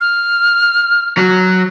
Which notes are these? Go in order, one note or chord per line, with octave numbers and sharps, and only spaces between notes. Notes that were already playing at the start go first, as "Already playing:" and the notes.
F6
F#3